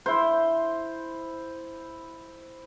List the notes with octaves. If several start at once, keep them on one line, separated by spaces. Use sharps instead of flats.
E4 C5